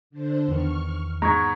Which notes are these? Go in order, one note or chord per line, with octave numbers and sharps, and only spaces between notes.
D3 D4 C5
E2 D#3 C#6 F6
G#2 B3 A#5 C#6 G#6